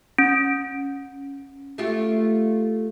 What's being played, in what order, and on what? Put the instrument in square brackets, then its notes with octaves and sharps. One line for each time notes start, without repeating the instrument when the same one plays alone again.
[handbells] C#4
[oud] A3 F4 G4